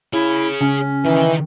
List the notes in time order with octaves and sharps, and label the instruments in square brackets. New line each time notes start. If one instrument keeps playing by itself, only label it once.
[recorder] E4 [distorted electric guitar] G#4 C#5
[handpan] C#3 [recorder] C#4
[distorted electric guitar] D#3 [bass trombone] E3